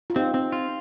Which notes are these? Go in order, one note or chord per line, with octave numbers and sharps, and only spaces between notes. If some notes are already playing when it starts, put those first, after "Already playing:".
F4
C4 D#4 G4
C4
F4